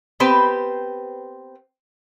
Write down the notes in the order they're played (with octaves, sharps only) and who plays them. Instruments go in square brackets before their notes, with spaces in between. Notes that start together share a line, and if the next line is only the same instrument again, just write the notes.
[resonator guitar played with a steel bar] B3 C4 G4 B4 C5